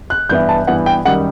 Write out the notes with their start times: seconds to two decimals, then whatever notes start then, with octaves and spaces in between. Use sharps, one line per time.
0.10 F#6
0.29 G2 E3 B3 E4 G6
0.49 A5
0.67 G2 E3 B3 E4 F#5
0.86 G5
1.05 F#2 D#3 G3 D#4 F#5